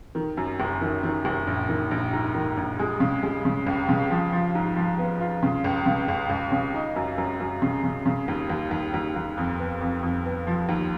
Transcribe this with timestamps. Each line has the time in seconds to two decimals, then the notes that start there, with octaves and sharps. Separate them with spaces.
0.15 D#3
0.37 F#2
0.60 F#1
0.81 D#3
1.03 D#3
1.25 F#1
1.47 A#1
1.69 D#3
1.91 A#1
2.13 G#2
2.35 D#3
2.57 A#1
2.79 G#3
3.00 C#3
3.23 G#3
3.45 C#3
3.67 C#2
3.89 C#3
4.11 F3
4.32 F3
4.55 G#2
4.76 F3
4.98 B3
5.21 F4
5.43 C#3
5.64 C#2
5.86 C#3
6.08 C#2
6.30 C#2
6.52 C#3
6.74 D#4
6.96 F#2
7.18 F#2
7.40 F#2
7.62 C#3
7.84 C#3
8.06 C#3
8.28 D#2
8.50 D#2
8.71 D#2
8.94 D#2
9.16 D#2
9.38 F2
9.59 B3
9.81 F2
10.03 F2
10.25 B3
10.47 F3
10.69 D#2